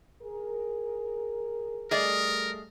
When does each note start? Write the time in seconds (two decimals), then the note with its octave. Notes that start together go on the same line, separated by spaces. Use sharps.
0.21 G#4 A#4
1.91 G3 A3 G#4 A#4 D5 D#5